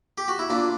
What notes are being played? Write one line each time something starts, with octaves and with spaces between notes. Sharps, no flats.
G4
F#4
E4
A#2 D4